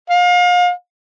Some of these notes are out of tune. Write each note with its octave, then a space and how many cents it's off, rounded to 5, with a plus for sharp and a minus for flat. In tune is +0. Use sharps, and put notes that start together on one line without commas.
F5 +35